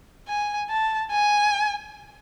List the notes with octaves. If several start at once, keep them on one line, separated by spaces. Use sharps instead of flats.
G#5
A5
G#5